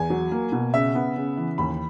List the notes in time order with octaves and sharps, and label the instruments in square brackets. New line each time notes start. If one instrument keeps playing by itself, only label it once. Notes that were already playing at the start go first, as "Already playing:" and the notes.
Already playing: [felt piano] E2 [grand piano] G#5
[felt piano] F#3
A#3
B2
[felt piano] C#3 [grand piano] E5
[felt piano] B3
C#3
E3
[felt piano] D#2 [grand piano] B5